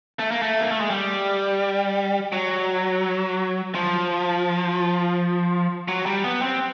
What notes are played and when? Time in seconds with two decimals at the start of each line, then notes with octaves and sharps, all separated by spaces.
0.19 A3
0.31 A#3
0.42 A3
0.61 A#3
0.71 A3
0.80 G#3
0.90 G3
2.32 F#3
3.75 F3
5.88 F#3
6.06 G3
6.24 B3
6.42 C4